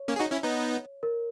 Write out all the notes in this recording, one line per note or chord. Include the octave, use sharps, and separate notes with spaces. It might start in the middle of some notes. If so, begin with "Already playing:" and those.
Already playing: C#5
A#3 C#4
G#4
D#4 F#4
C#4 E4
B3 D#4
A#4